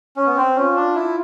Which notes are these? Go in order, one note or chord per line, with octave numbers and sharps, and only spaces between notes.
C#4
B3
C4
C#4 F4
D4
E4